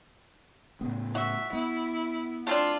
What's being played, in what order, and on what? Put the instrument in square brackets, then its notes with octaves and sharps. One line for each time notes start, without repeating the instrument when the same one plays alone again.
[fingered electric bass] A2 C#3 B3
[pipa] F#4 [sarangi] E5
[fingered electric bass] B3 [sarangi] E4
[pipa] A3 C4 D4 [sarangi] F4